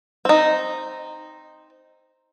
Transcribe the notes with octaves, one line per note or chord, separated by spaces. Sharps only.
C4 D#4